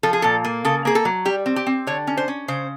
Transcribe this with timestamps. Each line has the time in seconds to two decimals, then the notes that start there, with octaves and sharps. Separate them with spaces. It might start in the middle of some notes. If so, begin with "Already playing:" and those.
0.03 F3 A4
0.13 G#4
0.22 A#2 A4
0.45 A#3
0.65 C#3 A4
0.85 A#3 G#4
0.95 A4
1.05 F#3
1.25 G3 G4
1.46 C4
1.56 G4
1.67 C4
1.87 D3 C#5
2.07 C#4
2.17 C5
2.28 C#4
2.48 C#3 C5